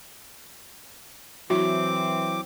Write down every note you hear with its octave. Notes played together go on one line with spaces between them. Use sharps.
E3 F#3 C4 E4 F#4 D6